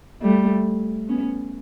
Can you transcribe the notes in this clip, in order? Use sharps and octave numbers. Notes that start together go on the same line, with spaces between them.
G3 A3
B3 C#4